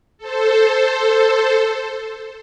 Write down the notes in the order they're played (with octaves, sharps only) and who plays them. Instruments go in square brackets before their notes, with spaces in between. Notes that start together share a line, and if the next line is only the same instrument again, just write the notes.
[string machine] A4 C5